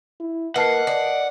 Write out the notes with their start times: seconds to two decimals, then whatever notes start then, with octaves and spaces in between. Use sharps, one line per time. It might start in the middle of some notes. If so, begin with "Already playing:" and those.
0.20 E4
0.56 A#3 B4 D#5 F#5 A5 C7
0.87 D5